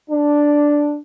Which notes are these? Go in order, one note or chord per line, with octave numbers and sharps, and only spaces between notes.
D4